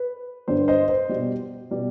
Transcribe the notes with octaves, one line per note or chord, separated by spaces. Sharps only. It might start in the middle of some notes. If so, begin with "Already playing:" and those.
Already playing: B4
G2 D3 G3 C5
C5 D#5
C5
B2 G3
B2 G3